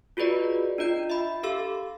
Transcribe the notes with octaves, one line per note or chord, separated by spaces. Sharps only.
F4 F#4 G#4 B4 D5 D#5
D4 F4 D#5 G6
E5 B5
G4 A4 F5 E6